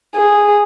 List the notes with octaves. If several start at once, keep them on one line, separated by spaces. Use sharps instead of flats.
G#4